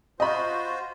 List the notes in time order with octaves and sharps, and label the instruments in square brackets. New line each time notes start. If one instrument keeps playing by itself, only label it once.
[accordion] F4 F#4 C5 [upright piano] D#5 B5